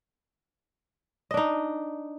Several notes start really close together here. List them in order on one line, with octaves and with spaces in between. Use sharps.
D#5 D4 D#4